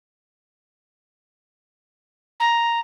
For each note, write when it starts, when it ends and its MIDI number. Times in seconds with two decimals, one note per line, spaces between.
2.40 2.80 82